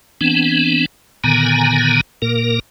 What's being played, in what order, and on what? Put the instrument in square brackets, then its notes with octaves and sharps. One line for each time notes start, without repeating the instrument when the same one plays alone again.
[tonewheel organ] E3 B3 C4 D4
A#2 D3 D#3 B3 G#5 A#5
A#2 A#3 A#4